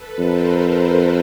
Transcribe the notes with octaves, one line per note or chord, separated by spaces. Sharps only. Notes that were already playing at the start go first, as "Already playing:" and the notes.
Already playing: A4 B4
F2 A#4 C5